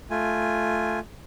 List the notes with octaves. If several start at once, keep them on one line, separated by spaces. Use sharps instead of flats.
A3 F4 G#5